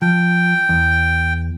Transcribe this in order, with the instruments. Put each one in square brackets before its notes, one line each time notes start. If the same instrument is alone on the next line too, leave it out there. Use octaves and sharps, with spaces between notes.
[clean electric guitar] F3 [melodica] G5
[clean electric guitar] E2